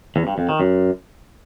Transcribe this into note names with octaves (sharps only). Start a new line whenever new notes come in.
E2
G2
F2
D#3
F#2